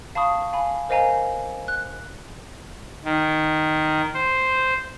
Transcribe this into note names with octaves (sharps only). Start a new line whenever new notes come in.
F5 A5 B5 C#6 D#6
F5 G#5 B5
A#4 C5 D#5 F5 G#5 A#5
F#6
D#3
C5